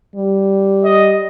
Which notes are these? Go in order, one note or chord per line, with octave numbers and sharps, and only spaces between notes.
G3
D#5